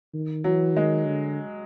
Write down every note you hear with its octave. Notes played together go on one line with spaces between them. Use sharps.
D#3
E3 F#3
D#3 G#3
D3